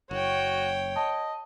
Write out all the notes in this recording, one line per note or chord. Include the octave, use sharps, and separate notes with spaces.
F#1 F#4 C#5 G5
D#5 A5